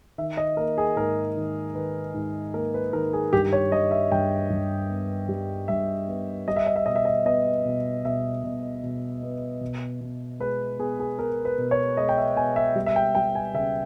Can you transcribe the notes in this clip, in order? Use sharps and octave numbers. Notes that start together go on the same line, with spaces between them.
D#3 E5
D#5
A#3 A#4
G#4
G#2 A#4
D#3
D#3 B4
G#2
A#3 A#4
B4
D#3 A#4
G#4
G2 G4
C#5
G3 D#5
E5
G2 G5
G2
B3
G3
G2 E5
B3
G3 D#5
E5
D#5
E5
B2 D#5
E5
D#5
B3 D#5
B2
B2 E5
B2
B2
B3
B2
B2
G#3 B4
B3 G#4
G#4
B3 A#4
B4
B2
C#5
G#3 D#5
G5
E5
B2 G#5
E5
G3
E5
G5
G3 G5
G#5
C#3 E5